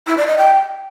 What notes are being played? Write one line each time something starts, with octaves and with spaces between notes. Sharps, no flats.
E4
D5
D#5
G5